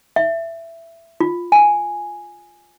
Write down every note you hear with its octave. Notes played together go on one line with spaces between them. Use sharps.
E5
F4
G#5